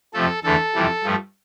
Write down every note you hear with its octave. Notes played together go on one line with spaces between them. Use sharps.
F2 C3 F3 A3 A4
E2 D3 A3 A4
F2 C3 E3 G3
G2 F3 A3